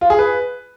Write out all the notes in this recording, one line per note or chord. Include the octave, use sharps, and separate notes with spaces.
F4
G#4
B4